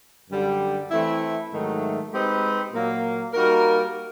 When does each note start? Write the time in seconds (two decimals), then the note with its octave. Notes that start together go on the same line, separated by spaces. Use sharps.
0.30 F#2 D3 G3
0.91 E3 A3 C4 E4
1.51 G#2 D#3 F#3 A3
2.12 G#3 C4 D#4 G4 B4
2.73 A#2 F#3 A#3
3.33 G3 A#3 D#4 F#4 A#4